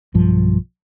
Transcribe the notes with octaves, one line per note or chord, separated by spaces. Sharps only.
B1 G2 F3